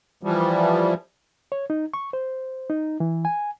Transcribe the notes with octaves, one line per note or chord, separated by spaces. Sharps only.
E3 F3 G3
C#5
D#4
C#6
C5
D#4
E3
G#5